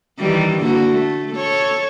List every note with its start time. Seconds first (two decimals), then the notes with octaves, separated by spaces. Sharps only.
0.19 D#3 E3 G3
0.59 D3 A#3 F#4
0.91 A3
1.32 A4 C#5